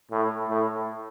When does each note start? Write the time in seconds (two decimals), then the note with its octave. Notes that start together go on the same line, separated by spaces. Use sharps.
0.11 A2
0.49 A2